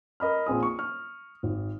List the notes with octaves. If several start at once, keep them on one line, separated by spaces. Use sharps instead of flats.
A#4 D#5 B5 F6
A#1 C4 G#4 D#6
C#6
C#6 F6
G#1